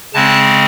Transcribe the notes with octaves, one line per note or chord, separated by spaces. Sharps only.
C#3 G#3 C4 A5